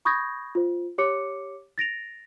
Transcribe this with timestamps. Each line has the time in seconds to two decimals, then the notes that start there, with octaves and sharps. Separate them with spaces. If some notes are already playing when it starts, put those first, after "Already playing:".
0.05 B5 C#6 D#6 G6 G#6 A#6
0.55 F4 C5
0.98 G4 C#5 D6 C#7
1.78 A6 A#6 D7 F7